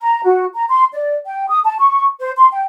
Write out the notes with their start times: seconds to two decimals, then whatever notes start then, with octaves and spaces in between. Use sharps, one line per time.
0.01 A#5
0.24 F#4
0.55 A#5
0.69 C6
0.93 D5
1.26 G5
1.49 D#6
1.65 A5
1.79 C#6
2.20 C5
2.38 C6
2.52 G5